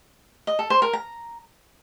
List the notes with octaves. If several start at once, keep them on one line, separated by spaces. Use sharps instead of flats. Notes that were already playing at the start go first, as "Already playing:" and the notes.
D#5
A4
C5
A#4
A#5